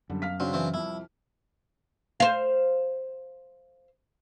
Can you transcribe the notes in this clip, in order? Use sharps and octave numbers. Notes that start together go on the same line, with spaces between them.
F#2 D3 G3
F5 F6 B6
C#3 C4 D4 F#4
E3 C4
C2 F2 E4
C5 F5